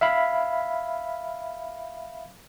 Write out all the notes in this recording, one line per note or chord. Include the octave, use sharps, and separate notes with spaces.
E5 F5 B5